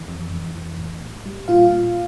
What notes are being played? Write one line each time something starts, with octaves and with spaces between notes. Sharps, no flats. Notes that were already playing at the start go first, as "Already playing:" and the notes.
Already playing: E3
F2
F2
E3
A2
A2
G3
A#2 F4 F5
A#2